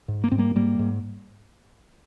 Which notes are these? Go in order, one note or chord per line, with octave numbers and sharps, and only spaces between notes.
G#2
A#3
G#2 C4
G3 A#3
G#2 G3 A#3
G#2